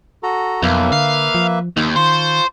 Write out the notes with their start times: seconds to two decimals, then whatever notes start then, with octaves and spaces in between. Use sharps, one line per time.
0.23 F#4 A4 A#5
0.62 B1 F2 A#3 B4 E5
0.92 D3 F5
1.35 F3
1.77 D#2 D#3
1.96 F4 C5 A5 C#6